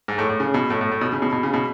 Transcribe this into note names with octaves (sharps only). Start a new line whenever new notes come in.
G#2
A2
A2
C#3
B2
A2
A2
A2
B2
C#3
B2
B2
C#3
B2